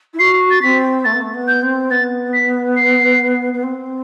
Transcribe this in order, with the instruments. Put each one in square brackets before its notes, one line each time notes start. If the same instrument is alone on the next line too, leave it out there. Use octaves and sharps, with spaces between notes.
[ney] E4
[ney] F#4 [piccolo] C7
[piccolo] A6
[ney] C4 [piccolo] B6
[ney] A3 [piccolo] A6
[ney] B3
A3
B3
[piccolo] G6
[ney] C4
[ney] B3 [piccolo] A6
[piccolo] B6
C7
[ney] B3
C4